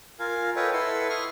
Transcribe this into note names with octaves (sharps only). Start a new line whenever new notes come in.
F4 A#4 F5 G#5
A4 B4 C#5 D#5 G5
E4 A4 B4 F#5 C6 E6
C6 C#6 D#6 F6